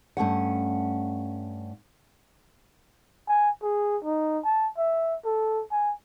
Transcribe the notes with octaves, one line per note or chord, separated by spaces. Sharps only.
G2 A3 C#4 F#5
G#5
G#4
D#4
A5
E5
A4
G#5